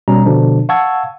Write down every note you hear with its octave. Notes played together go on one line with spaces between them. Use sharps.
B2 G3 C#4 A#5
B2 D3 F3 D4
F5 F#5 A5 C#6 E6 G#6